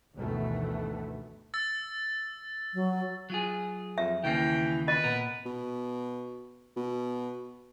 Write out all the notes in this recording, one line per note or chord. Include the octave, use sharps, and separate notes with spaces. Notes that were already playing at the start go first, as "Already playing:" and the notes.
G1 D2 B2 D#3 E3 A3
E6 A6
F#3
F#3 F4 G#4
F2 E5
D#2 C#3 E3 A#3 G5
F4 B4 D#5
A#2 B3 A#4
B2
B2